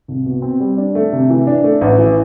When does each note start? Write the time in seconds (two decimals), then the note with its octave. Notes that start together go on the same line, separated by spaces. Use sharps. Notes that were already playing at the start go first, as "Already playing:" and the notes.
0.08 C2
0.26 B2
0.42 C4
0.60 G3
0.78 D4
0.95 A3
1.13 C3
1.30 E3
1.47 D4
1.64 A3
1.81 A1
1.98 E3